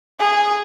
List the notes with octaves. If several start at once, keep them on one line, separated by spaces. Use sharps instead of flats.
G#4